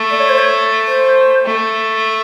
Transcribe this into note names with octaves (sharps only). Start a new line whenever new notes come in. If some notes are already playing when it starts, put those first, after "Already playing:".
Already playing: A3
D5
C#5
C5
C#5
C5
A3